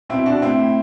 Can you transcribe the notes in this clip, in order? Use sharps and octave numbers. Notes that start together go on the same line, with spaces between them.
B2 C4 E4
B2 D4 F#4
A2 C4 E4
A2